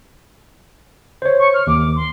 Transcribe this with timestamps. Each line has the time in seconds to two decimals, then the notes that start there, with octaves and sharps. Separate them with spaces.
1.22 C5 C#5
1.39 C#6
1.53 F6
1.67 D#2 D6
1.96 C6